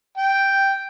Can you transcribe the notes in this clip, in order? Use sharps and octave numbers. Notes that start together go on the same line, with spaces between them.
G5